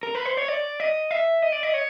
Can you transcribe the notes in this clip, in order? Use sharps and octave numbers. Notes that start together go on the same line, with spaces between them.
A#4
B4
C5
C#5
D5
D#5
E5
D#5
D5
D#5
C#5